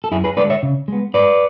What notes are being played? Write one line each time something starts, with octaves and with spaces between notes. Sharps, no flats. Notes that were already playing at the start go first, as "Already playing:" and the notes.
A4
F#2 E4 G#4
G#4 B4
D3 G#3 D4 B4 D5
C#5 E5
C#3
G#3 B3
G#2 B4 D5